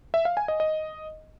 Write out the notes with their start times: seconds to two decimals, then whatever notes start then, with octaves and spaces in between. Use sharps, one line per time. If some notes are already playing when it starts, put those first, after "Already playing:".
0.14 E5
0.25 F5
0.37 G#5
0.48 D#5
0.60 D#5